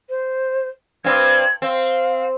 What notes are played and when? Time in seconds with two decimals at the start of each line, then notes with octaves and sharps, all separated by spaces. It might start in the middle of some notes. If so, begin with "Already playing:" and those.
0.09 C5
1.04 G2 C4 G#6
1.62 C4 F5